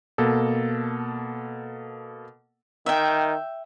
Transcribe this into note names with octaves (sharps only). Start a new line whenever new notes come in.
B2 A#3 A4
D#3 E5 G5